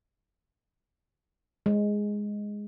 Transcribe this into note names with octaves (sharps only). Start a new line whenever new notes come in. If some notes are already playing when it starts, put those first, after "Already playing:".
G#3